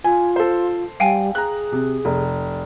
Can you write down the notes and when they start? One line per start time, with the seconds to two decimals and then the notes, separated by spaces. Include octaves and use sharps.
0.04 F4 G#5
0.36 A4 C5
1.00 G3 F5 G5 G#5
1.35 G#4 A#5 F#6
1.72 C3
2.05 F1